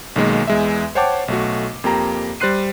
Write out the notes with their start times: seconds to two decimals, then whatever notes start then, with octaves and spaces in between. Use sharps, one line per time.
0.16 B1 D#3 G#3 A#3
0.47 E2 G#3 E5
0.95 C5 C#5 F#5 G5 A5 D6
1.28 B1 A3 F#4
1.84 F2 A#3 G4 A#5
2.40 G3 C5 C6 F#6 C7 D#7